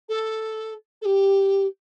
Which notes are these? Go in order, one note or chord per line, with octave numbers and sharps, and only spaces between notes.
A4
A4
G4